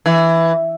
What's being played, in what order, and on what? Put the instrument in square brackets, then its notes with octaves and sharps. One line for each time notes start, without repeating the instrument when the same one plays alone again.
[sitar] E3